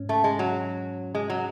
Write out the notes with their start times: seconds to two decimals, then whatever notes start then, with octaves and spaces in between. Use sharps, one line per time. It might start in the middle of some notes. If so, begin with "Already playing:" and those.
Already playing: G#2 C#4
0.09 A3
0.24 G#3
0.39 F#3
1.15 G#3
1.30 F#3